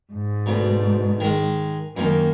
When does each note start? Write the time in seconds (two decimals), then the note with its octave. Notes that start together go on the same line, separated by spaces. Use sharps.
0.13 G#2
0.46 D2 B2
1.20 D#3 G#3
1.97 F#2 D#3 A#3